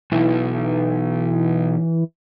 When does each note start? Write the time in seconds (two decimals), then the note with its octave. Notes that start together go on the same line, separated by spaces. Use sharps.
0.12 B1 E3